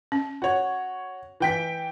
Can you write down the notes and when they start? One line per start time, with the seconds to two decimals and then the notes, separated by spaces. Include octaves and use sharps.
0.12 C#4
0.42 F#4 C#5
1.40 E3 G5 B6